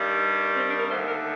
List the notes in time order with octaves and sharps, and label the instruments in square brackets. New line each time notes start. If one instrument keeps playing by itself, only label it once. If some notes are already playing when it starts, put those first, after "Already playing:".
Already playing: [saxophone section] G2 D#3 G3
C4
D4
A#4
D#2 D3 A3 C5
A#4